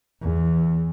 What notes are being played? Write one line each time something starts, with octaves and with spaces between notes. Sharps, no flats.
E2